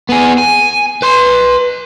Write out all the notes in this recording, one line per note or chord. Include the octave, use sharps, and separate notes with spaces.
B3 G#4
G#5
B4 C6